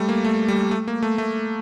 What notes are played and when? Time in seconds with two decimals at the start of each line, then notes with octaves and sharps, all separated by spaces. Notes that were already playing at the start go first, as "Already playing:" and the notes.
Already playing: G3 A3
0.09 A#3
0.24 A3
0.48 G3
0.71 A3
0.88 A#3
1.03 A3
1.18 A3